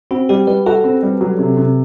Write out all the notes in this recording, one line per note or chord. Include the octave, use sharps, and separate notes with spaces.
C4 F#4
G3 G4
G3 B4
F#4 A4
C4
G3
F#3
C3
C3